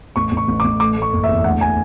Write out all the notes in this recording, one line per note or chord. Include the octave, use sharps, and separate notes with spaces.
A1 C#6
A1
C#6
A1
D6
A1
A3 D6
A3
C#6
F#1
E5
E2
D2 F#5
G#5